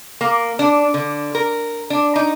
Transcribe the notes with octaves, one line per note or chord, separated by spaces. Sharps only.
A#3
D4
D3
A#4
D4
D#4